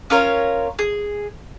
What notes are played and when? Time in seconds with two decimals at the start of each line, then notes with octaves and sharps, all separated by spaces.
0.10 C#4 F4 A#4 C#5
0.79 G#4